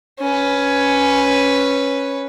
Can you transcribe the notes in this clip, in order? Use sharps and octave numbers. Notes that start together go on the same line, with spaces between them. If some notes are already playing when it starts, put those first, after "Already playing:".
C#4 B4